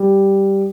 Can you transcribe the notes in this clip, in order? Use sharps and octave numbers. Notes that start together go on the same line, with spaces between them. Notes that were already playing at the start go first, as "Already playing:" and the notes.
Already playing: G3